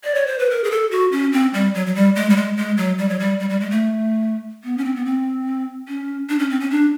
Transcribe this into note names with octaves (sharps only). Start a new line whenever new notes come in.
D5
C#5
C5
B4
A#4
G#4
A4
F#4
C#4
C4
G3
F#3
F#3
G3
G#3
G3
G#3
G#3
F#3
G3
F#3
G3
G3
G3
G#3
A3
B3
C#4
C4
B3
C4
C#4
D4
C#4
C4
C#4
D4